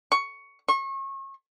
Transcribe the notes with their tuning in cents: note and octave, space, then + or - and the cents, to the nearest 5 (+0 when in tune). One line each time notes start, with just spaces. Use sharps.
C#6 +10
C#6 -35